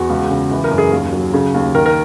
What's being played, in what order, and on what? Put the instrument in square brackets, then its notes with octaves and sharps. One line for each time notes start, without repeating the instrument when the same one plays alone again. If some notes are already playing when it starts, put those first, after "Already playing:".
Already playing: [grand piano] E2 F#4
C#2
C#3
E3
A#4
F#2
G#4
D#2
F#3
C#3
D#2
D#3 A#4
A#4